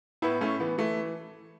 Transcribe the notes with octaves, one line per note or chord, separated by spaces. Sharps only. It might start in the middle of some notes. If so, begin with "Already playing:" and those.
A2 B3 E4
A2 A3 C#4
E3 B3
E3 A3